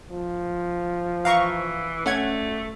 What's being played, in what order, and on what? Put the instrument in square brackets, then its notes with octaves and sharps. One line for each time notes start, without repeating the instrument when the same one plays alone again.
[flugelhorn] F3
[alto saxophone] E3 [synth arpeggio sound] F5 A#5 C#6
[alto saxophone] A3 [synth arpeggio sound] C#4 F#5 G#6